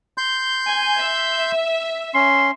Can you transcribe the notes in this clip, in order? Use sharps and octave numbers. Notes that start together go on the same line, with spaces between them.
C6 G6
G#5
E5
C#4 C6